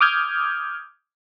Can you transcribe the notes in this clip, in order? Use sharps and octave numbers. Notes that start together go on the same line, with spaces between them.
D6 D#6 F6 G6 G#6